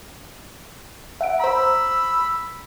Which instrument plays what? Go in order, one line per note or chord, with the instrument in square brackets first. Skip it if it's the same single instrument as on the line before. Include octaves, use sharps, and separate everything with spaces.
[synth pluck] E5 F#5 D7
[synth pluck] C5 A#5 [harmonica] B5 E6